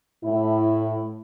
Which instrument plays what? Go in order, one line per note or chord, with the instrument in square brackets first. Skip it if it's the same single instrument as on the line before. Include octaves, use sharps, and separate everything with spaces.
[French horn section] A2 E4